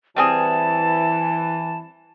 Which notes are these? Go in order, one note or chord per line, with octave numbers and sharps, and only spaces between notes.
E3 G3 C4 G#4 A5